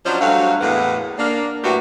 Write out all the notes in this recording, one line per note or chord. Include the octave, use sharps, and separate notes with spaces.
F3 F#3 C#4 D4 C5 D#5
G2 F#3 A3 F#4 F5
E2 A2 G#3 A#3 B4 F#5
A#3 D4
A2 F#3 F#4 G4 B4 E5